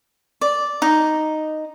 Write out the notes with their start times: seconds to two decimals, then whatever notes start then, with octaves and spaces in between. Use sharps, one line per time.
0.41 D5
0.82 D#4